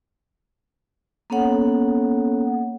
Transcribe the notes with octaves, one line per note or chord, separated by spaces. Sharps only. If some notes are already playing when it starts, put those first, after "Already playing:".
A#3 B3 C#4 A4 C#5 F#5